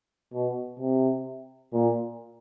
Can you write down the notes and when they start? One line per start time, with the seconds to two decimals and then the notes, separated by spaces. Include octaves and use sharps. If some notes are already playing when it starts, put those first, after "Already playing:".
0.33 B2
0.79 C3
1.73 A#2